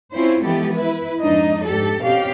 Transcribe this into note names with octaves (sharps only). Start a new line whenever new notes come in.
C4 C#4 E4 F4 C5
E3 F3 G#3 B3 G4 A4
E4 B4
F2 G#2 D4 D#4 D#5
G#2 G4 A4
B2 C4 C#4 G4 F5